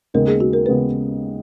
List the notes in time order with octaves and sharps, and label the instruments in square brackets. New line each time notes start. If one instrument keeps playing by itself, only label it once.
[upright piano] D#2 C#3 G#3 B3 [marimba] A#4
[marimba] G#4
F#4
A#4
[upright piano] C#3 G#3 B3 [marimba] B4